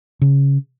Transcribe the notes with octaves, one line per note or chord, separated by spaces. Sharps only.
C#3